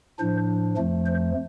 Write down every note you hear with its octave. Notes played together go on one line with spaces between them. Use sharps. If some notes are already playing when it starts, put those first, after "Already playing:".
A2 F3 D4 C5
F2 F3 A3
C5